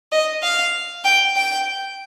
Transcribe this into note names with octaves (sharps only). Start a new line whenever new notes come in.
D#5
F5
G5
G5